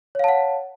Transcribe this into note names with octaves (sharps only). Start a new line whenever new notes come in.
C#5 F5 F#5 A5